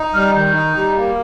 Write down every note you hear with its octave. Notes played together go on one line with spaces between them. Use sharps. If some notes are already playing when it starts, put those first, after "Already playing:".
Already playing: D#4
G3 F6
D#3 G6
D#4
G3
A#3